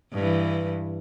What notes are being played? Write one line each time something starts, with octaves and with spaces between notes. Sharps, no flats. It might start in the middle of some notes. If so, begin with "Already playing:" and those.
G2 E3